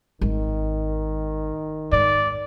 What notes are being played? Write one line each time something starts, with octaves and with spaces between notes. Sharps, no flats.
G#1 D#3
G#2 D5